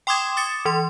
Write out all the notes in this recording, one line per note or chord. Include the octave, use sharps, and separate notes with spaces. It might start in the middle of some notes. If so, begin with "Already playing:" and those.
G5 C6 D6 D#6 G#6 E7
D6 D#6 A6 C#7 E7
E3 C6